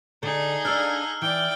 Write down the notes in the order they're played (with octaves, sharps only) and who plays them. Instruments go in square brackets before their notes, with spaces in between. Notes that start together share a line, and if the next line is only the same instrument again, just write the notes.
[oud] D3 [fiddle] D#4 G#4
[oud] D4 F5 [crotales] E6 F6
[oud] E3 [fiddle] D5 G5